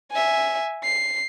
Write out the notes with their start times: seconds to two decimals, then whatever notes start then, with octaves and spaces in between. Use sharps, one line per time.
0.11 E5 G#5
0.84 C7